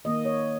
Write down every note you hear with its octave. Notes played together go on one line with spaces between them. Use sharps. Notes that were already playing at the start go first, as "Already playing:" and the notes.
D#3 A#3 D#5
C#5